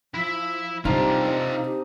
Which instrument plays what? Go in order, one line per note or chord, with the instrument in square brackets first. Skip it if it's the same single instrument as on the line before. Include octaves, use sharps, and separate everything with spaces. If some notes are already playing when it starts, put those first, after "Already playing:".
[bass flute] F3 [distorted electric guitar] E4 E5
[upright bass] C3 [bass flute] G3 [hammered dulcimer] C4 D4 D#4 [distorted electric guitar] F4 G4
[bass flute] D#4 [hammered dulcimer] D#5
[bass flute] G4